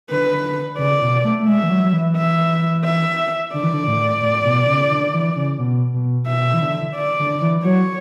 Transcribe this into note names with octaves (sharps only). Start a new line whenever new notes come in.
D3 B4
C#3 D5
B2
A3
A3
G#3 E5
E3
F#3
F#3
E3
E5
E5
D3 D5
E3
D3
A2
A2
B2
C#3
D3
E3
C#3
B2
B2
B2 E5
E3
D3
D5
D3
E3
F#3 C#5